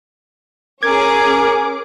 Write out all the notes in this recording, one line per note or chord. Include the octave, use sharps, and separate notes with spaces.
C#4 G#4 A#4 D6 G#6